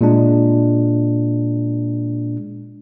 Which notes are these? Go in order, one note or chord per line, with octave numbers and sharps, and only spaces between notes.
A#2 G#3 D4